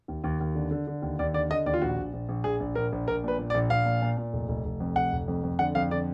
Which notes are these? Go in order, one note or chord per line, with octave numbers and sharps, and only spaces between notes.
D#2
D#2
D#2
D3
D3
D3
D#2
D#2 D5
D3 D5
D3 D#5
D#2 D5
F4
A#1 F#4
A#1
A#1
A#1
A#1 G#4
A#1
A#1 A#4
A#1
A#1 A#4
A#2 B4
A#2
D5
A#1
A#1 F5
A#2
A#2
A#2
F1
F1
F1
F2
F1 F#5
F1
F2
F2
D3 F#5
F2 F5
D3 D5